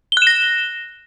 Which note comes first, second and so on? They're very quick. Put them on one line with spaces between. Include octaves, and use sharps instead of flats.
G7 F#6 E7 A#6